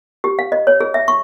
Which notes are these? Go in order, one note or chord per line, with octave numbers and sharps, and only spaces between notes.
G4
F5
D#5
C#5
G#4
E5
C#6